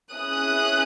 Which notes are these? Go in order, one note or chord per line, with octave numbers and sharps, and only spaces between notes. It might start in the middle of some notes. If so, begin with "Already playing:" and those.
C#4 E4 G#4 D#6 F#6